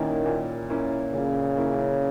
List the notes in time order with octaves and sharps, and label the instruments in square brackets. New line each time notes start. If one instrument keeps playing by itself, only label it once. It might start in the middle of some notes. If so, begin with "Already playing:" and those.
Already playing: [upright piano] A#2 A#3 C#4 E4 [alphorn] D#3
[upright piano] A#2
A#3 C#4 E4
[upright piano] A#2 [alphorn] C#3
[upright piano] A#3 C#4 E4